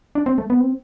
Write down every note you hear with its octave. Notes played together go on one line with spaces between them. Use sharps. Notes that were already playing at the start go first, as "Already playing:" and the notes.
D4
C4
A3
B3
C4